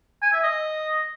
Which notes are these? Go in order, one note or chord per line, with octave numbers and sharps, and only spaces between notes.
G#5
E5
D#5